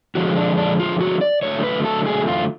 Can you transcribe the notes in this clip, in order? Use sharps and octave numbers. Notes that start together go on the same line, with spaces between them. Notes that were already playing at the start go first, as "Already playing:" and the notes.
D3 F3 G#3 F#4
D4
D4
F4
F#4
D5
D3 F#3 A3 C#5
B4
A4
G#4
F4